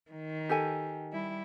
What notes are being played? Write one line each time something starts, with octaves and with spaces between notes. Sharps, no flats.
D#3
G4 A4 G#5
G3 E4